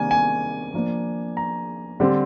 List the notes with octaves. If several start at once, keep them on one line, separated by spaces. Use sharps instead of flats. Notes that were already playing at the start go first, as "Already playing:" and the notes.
Already playing: C3 D#3 G3 A#3 D4 G#5
G#5
F3 A#3 D4
A#5
D3 G3 C4